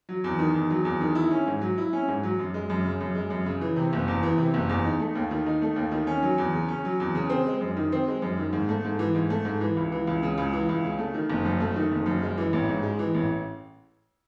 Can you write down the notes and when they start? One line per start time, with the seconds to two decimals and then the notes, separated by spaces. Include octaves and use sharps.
0.09 F#3
0.24 E2
0.39 D#3
0.54 E2
0.70 F#3
0.85 E2
1.01 D#3
1.15 E4
1.31 C#4
1.47 G#2
1.61 F#3
1.78 E4
1.93 C#4
2.08 G#2
2.23 F#3
2.39 F#2
2.54 G#3
2.70 F#2
2.85 C#3
3.00 F#2
3.15 G#3
3.30 F#2
3.46 C#3
3.61 E3
3.76 C3
3.93 F#1
4.08 E2
4.23 E3
4.38 C3
4.54 F#1
4.69 E2
4.84 D#4
5.00 A3
5.15 D#2
5.31 D#3
5.46 D#4
5.62 A3
5.76 D#2
5.91 D#3
6.07 C#4
6.22 F#3
6.38 E2
6.53 C#3
6.69 C#4
6.85 F#3
7.00 E2
7.15 C#3
7.30 C4
7.46 G#3
7.61 F#2
7.77 D#3
7.92 C4
8.08 G#3
8.22 F#2
8.38 D#3
8.53 G#2
8.69 A3
8.85 G#2
8.99 E3
9.15 G#2
9.30 A3
9.45 G#2
9.61 E3
9.77 C#2
9.92 E3
10.07 C#2
10.23 C#3
10.38 C#2
10.53 E3
10.69 C#2
10.84 C#3
10.99 A3
11.14 D#3
11.30 F#1
11.45 F#2
11.60 A3
11.76 D#3
11.92 F#1
12.06 F#2
12.23 G#3
12.38 E3
12.53 A1
12.69 G#2
12.83 G#3
12.99 E3
13.14 A1